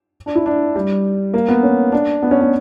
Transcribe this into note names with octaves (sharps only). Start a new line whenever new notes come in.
D4
E4
D4
G3
A#3
B3
C#4
D4
B3
C#4
B3